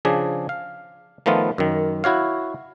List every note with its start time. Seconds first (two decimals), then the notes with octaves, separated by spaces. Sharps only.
0.05 C#3 F3 D4 G#4
0.49 F5
1.26 D#3 F3 A3 B3 F4
1.58 F#2 D#3
2.04 E4 F#4 C#5 F5